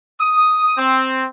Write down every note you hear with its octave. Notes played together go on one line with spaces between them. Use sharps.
D#6
C4